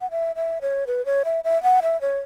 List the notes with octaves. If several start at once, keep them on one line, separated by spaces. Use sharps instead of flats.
F#5
E5
E5
C#5
B4
C#5
E5
E5
F#5
E5
C#5